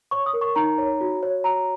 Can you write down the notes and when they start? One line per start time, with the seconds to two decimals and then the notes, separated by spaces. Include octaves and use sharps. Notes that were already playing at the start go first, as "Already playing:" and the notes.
0.11 C#5 C#6
0.26 D#6
0.33 A#4
0.41 C#6
0.56 D#4 A#5
0.78 C#5
1.01 F#4
1.23 C#5
1.44 F#4 A#5